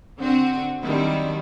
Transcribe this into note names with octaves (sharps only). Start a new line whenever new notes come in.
D3 C4 F#4
D#3 F#3 G3 C4 D4 E4